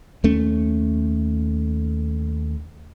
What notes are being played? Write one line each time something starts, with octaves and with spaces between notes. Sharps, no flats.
D#2 A3 C#4